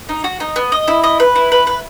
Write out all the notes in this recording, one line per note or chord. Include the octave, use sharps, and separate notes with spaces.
D#4
F#4
D#4
B3
D#5
E4
D#5
B4
E4
B4
B4